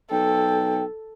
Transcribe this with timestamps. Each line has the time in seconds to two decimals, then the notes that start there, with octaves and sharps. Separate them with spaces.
0.11 B1 A4 G5